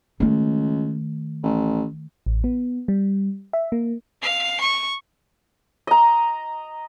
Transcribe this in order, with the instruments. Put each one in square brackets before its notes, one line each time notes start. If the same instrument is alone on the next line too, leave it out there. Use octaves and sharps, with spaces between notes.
[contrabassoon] C#2 [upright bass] D#3 A3
[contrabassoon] A1
[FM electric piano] A1
B3
G3
E5
A#3
[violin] F5 C7
C#6
[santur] D#5 A#5